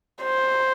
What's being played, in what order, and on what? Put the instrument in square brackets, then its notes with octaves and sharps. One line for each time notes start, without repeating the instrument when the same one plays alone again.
[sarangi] C5